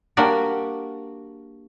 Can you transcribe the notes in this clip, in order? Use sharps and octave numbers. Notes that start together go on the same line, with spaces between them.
G3 A#3 D4 F#4